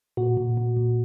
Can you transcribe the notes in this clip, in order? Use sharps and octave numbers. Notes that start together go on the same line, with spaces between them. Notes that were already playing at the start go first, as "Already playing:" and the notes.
A#2 F#4
A#2
A#2
A#2